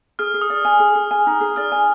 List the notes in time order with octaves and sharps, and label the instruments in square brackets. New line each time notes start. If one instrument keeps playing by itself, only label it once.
[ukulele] G#4 [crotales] F6
[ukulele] G#4
[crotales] D#6
[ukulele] D5
G#5
G#4
G#4
G#5
D#4
G#4
[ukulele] D5 [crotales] F6
[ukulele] G#5